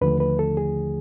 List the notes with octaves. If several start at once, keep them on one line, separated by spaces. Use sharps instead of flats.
D#2 D3 F3 A3 B4
B4
A4
G#4